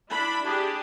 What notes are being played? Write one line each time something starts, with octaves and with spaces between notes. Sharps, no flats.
D4 E4 B5
D4 G4 G#4